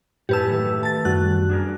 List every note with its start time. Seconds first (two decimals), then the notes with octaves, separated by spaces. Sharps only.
0.29 F#2 A2 C#4 G4 B4 A5 E6
0.50 D#3 E3 A3
0.83 A5 A6
1.05 F#2 G3 F#4 F#6
1.50 D4 G#4 A#4